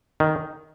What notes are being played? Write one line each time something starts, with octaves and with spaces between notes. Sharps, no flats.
D#3